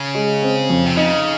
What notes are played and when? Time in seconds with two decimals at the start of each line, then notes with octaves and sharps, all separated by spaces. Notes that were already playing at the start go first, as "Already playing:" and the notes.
Already playing: C#3
0.15 G#3
0.42 C4
0.70 F2
0.86 C3
0.97 C#3 D#4